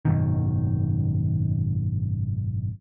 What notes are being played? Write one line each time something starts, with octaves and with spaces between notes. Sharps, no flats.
G#1 F#2 B2 D#3